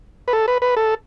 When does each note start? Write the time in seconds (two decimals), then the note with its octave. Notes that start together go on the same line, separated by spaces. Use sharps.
0.28 B4
0.33 A4
0.48 B4
0.62 B4
0.77 A4